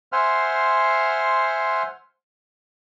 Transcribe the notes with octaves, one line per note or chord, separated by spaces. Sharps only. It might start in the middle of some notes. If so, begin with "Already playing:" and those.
C5 E5 F#5 G#5 C6 F6